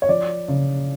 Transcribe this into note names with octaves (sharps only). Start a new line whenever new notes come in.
C#5
F3 D5
C#3